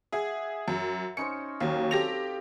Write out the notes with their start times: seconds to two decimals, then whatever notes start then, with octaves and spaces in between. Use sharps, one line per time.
0.12 G#4 E5 F#5
0.68 F#2
1.17 C#4 D#4 C5 C#7
1.60 D#2 F#3 F5
1.91 C4 G4 A4 A#6 F7